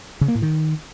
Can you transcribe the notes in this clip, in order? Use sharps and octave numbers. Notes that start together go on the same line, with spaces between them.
C#3
A#3
A2
D#3